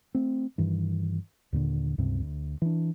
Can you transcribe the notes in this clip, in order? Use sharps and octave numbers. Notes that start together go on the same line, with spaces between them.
A3 C4
G2 D#3 E3
D#2 A#2 D3
C#2 G2 C3 C4
D2
E3 D4